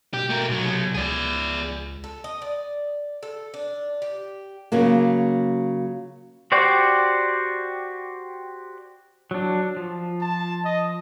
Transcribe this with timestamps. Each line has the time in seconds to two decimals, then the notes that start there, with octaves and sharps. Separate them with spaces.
0.14 B2 G4
0.29 A3 A#4
0.49 B1 F#3
0.62 C3
0.94 C#2 G#4 D5
2.04 A4
2.24 D#5
2.42 D5
3.23 A4
3.54 D4
4.02 G4
4.72 C#3 F#3 A#3
6.52 F#4 G4 C5 D5 G5
9.31 F#3 D4
9.77 F3
10.21 A5
10.64 D#5